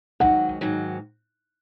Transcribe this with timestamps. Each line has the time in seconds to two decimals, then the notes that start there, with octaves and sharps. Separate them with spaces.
0.20 G#2 D#3 F#3 F#5
0.61 G#2 D#3 F#3